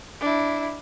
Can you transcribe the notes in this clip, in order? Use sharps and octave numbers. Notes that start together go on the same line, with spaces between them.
D4 E4